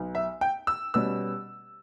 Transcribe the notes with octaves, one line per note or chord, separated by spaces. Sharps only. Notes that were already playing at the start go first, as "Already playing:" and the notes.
Already playing: B1
E5
G5
E6
B2 G3 C#4 E6